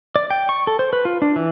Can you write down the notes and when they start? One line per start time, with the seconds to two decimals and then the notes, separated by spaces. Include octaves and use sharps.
0.16 D5
0.30 G5
0.49 C#6
0.67 A4
0.79 C5
0.93 B4
1.05 F4
1.22 D4
1.36 E3